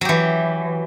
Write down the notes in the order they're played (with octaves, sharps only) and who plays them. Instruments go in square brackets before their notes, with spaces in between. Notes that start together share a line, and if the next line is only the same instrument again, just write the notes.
[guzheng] F#3
G4
E3